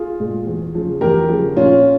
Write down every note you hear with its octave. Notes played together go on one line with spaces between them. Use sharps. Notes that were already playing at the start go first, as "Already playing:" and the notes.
Already playing: F4 G#4
A#2 G#3
E2
C#3 F3
E2 G4 A#4
C#3 F3
A#2 C#4 F4